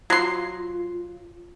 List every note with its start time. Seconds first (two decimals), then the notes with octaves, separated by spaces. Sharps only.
0.10 F#3 F4 C6